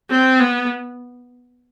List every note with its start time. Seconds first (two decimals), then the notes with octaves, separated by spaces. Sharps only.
0.10 C4
0.40 B3